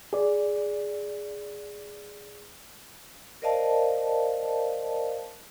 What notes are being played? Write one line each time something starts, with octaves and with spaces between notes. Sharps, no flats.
G#4 D5
A#4 C5 D5 D#5 F5 A5